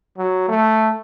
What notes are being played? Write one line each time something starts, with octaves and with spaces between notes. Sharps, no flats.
F#3
A3